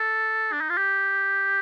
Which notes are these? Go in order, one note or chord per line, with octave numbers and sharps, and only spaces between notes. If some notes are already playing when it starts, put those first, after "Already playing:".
Already playing: A4
D4
D#4
F4
G4